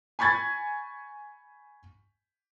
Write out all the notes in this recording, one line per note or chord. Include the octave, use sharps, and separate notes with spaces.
G#5 B5 C#6 G#6 A6